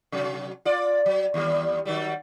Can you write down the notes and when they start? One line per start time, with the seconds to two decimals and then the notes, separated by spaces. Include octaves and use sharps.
0.12 C3 F#3
0.65 F4 D5
1.06 F#3
1.34 D#2 G3
1.85 D#3 F#3 G3